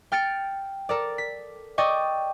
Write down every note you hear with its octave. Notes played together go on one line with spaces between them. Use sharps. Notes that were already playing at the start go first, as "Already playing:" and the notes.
G5 F6 A6 C#7 D7
A4 A#4 D5
B6
D5 D#5 G5 C#6